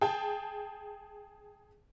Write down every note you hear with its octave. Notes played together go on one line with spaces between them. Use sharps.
G#4 G5 A5